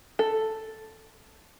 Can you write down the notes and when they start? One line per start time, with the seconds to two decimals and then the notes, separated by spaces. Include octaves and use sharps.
0.19 A4